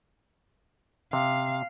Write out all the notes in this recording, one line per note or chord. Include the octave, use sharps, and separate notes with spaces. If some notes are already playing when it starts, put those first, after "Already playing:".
C3 F5